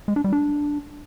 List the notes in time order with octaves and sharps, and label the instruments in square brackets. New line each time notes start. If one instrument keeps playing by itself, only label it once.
[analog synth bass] G#3
D4
G3
D4